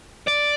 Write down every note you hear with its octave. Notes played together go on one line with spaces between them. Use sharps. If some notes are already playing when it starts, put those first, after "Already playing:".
D5